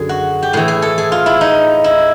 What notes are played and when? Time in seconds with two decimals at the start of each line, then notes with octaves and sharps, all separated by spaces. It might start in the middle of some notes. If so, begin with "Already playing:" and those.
Already playing: F#2 D3 G#4
0.09 F#4
0.42 G4
0.53 A2 E3 G#4
0.68 G#4
0.82 A4
0.98 G#4
1.12 F4
1.26 E4
1.41 D#4
1.84 E4